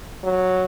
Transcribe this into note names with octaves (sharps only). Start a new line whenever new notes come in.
F#3